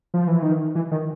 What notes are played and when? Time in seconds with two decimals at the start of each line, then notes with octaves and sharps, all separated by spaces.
0.14 F3
0.28 E3
0.42 D#3
0.75 E3
0.92 D#3